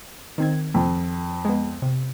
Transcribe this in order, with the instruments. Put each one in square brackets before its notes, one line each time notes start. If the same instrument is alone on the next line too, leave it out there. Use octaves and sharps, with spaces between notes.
[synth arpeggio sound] D#3 C4 G#6
[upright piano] F2
[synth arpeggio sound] G#3 B3
C3